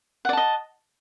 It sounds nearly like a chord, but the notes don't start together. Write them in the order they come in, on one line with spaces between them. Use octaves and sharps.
F#5 D5 A5 D#5